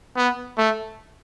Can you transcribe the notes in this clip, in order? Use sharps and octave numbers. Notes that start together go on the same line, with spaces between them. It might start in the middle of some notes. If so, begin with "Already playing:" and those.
B3
A3